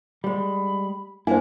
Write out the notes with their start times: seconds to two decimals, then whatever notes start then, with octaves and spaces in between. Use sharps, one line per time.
0.24 G3 G#3 B5
1.27 A#3 D4 E4 C5 F#5 G#5